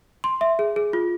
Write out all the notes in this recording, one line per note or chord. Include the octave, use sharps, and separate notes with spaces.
C6
E5
G#4
G#4
F4